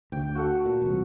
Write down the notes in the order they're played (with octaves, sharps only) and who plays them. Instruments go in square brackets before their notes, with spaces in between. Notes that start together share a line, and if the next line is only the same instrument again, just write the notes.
[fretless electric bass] D2 [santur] G5
[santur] F#4 A4 F#5
[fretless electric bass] A#2
E1 C2